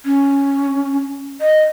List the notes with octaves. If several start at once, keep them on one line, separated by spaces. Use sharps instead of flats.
C#4
D#5